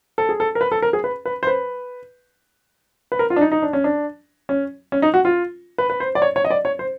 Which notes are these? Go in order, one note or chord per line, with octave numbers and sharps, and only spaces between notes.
A4
G#4
A4
A#4
B4
A4
A#4
G#4
B4
B4
C5
B4
B4
A#4
F4
D4
D#4
D#4
D4
C#4
D4
C#4
C#4
D#4
F#4
F4
B4
B4
C5
D5
C#5
C#5
D#5
D5
C#5
C5